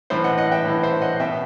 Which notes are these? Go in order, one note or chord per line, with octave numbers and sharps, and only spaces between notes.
A2 E3 C5 E5
D#5 F#5
D#5 F#5
E5 G5
A2 E3
C5 E5
D#5 F#5
B2 E5 G5